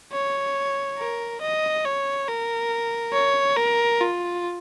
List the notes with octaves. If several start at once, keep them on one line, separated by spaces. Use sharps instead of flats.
C#5
A#4
D#5
C#5
A#4
C#5
A#4
F4